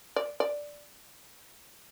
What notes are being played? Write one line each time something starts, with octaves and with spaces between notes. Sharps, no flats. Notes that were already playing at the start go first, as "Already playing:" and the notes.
D5
D5